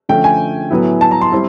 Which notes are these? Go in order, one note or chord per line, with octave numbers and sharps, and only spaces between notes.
D3 F3 A3 C#4 G5
G#5
A2 F#3 B3 E4
A5
A#5
C6
G3 C4 E4